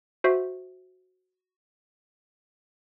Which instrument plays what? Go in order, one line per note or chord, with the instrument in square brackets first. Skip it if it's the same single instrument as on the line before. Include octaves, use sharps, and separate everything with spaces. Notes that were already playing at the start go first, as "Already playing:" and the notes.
[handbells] F#4 C5 E5